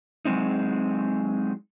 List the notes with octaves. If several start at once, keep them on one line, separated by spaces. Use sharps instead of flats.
F#3 G#3 C4 D#4